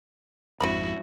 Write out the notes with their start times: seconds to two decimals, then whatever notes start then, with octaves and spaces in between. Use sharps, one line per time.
0.60 G#1 F2 G#2 C4 D4 E4 F#4 B5